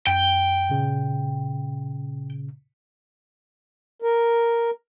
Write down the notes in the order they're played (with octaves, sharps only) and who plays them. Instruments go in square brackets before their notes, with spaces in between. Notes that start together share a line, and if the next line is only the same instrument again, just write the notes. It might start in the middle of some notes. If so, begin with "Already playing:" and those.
[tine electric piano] F#2 [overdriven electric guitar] G5
[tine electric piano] A#2 C#3
[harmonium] A#4